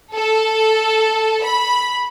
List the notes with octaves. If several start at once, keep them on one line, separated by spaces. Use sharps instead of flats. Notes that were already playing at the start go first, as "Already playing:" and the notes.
A4
B5